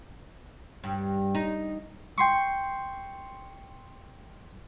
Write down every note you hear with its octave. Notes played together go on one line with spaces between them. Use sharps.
G2
D#4
G5 C6 C#6